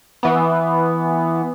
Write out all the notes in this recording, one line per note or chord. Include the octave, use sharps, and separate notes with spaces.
E3 B3